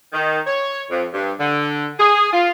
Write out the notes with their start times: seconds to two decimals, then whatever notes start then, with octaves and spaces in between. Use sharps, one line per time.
0.13 D#3
0.46 C#5
0.90 F2
1.14 G2
1.40 D3
1.99 G#4
2.33 F4